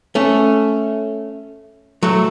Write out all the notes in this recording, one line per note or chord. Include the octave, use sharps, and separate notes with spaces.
A3 C#4
F#3 A3